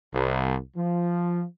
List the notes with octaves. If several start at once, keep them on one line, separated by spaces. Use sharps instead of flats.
C2
F3